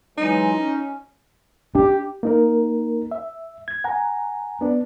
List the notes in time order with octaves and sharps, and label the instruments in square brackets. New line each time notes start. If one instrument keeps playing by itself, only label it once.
[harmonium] E3 F#3 G#3 [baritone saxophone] D#4
[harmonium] C#4
[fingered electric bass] D4 [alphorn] G4
[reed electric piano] A#3 D#4 A#4
E5
G#6
F#5 G#5 A#5
B3 D4